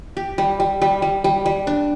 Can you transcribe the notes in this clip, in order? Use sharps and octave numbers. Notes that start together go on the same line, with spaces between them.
G4
G3
G3
G3
G3
G3
G3
D4